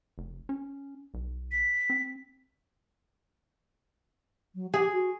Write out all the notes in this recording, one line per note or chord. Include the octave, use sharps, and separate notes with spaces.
F1
C#4
B1
B6
C4
F#3
G4 G#4
F#4